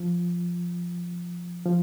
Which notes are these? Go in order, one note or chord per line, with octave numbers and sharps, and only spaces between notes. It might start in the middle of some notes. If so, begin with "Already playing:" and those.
Already playing: F3
F3